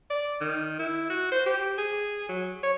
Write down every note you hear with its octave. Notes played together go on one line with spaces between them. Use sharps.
D5
D#3
E4
F#4
C5
G4
G#4
F#3
C#5